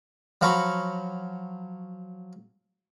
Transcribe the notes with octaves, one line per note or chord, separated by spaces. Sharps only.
F3 F#3 F5 A#5 B5 C#6